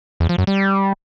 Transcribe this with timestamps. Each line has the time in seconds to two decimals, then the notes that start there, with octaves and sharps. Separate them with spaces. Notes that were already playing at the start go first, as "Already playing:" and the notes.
0.20 E2
0.29 F3
0.38 F#2
0.47 G3